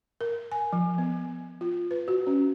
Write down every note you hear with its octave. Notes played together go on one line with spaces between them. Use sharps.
A#4
G#5
F3
B3
F4
B4
F#4
C#4